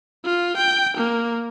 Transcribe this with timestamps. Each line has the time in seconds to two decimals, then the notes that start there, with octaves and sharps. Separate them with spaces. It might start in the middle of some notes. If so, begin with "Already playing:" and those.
0.25 F4
0.57 G5
0.97 A#3